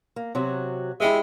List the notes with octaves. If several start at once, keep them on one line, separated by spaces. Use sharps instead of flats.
A#3
C3 F#3 F#4
G#3 E4 G4 E5